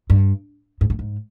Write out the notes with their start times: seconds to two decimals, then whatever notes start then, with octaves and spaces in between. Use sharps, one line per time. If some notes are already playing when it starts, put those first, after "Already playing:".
0.10 G2
0.81 G#2
0.90 A2
0.99 G#2